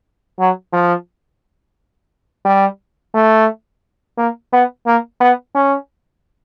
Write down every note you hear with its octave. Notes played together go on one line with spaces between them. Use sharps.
F#3
F3
G3
A3
A#3
B3
A#3
B3
C#4